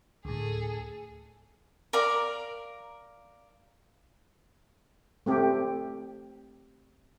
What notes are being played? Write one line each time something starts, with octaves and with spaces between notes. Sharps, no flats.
D2 A2 G#4 A4
A#4 D5 F5 A#5
A3 C4 G4